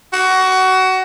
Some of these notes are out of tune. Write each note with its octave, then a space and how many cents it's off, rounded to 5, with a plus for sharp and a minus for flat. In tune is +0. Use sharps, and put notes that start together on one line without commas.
F#4 +20